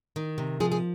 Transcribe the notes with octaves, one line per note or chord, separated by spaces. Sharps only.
D#3
C3
F3 G#4
G#4